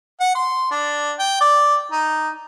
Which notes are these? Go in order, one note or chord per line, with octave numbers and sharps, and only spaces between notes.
F#5
C6
D4
G5
D5
D#4